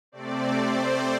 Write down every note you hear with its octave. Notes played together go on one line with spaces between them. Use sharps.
C3 A3 C4 D5
C5